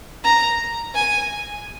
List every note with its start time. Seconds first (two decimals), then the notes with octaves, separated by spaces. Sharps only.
0.24 A#5
0.95 G#5